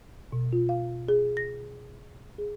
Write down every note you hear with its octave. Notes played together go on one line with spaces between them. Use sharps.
B2
F4
F5
G#4
A#6
G#4